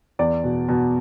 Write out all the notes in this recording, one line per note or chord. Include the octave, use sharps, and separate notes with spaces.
E2 D5
B2
B2